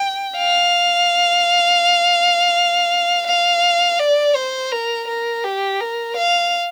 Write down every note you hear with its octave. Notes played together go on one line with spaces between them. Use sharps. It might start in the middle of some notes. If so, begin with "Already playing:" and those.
Already playing: G5
F5
F5
D5
C5
A#4
A#4
G4
A#4
F5